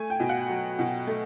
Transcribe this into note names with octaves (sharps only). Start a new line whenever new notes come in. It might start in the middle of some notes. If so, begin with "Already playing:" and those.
Already playing: A3 G#5
G5
B2
F#5
F#3
B2
A3